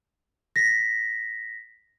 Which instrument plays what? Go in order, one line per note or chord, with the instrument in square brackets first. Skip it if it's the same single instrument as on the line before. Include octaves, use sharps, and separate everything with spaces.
[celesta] A#6 B6